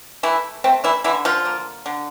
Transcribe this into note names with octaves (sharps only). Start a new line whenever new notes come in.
E3 A3 E4
A3 C4
E3 E4
D3 E3 E4
F3 F4
A#3
D3